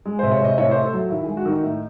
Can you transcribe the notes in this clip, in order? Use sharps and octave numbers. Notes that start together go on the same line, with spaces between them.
G#3
C3 C5
C#5
C3 D#5
A2 C#5
A3 C5
A4
F#3 F#4
D#3 E4
G#3 G#4
F#4
D#3 D#4
A2